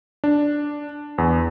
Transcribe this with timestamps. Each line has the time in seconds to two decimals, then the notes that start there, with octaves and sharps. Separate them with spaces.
0.24 D4
1.18 E2